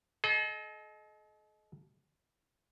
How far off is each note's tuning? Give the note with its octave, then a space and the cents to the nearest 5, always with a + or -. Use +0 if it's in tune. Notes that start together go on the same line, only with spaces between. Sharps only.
A4 -45 D#5 +0